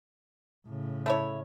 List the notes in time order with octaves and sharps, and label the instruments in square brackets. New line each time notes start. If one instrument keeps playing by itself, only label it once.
[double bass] A2 C#3
[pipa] A3 E4 C#5